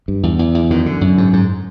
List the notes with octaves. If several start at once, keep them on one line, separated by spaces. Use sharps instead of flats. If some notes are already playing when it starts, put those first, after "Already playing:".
G2
E2
E2
E2
F#2 D#3
D3
F#2
G#2
G#2